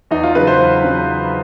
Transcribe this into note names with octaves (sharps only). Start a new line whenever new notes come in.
E2 D#4
F4
C#3 F#3 B4
C5
E2
C#3 F#3